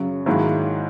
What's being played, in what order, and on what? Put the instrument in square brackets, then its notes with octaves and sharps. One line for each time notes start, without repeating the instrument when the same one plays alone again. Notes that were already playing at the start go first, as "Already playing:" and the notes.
Already playing: [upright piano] F#2 C#3 F#3
G#2 D#3 F#3 A#3 E4